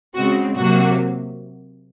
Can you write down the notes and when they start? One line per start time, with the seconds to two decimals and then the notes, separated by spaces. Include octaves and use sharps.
0.15 C#3 G#3 C4 F#4
0.57 C3 F#3 A#3 F#4